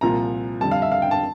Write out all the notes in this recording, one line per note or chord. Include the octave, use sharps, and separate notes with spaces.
C2 A#2 F3 A#5
F2 D3 G3 A5
F5
E5
F5
G5
A5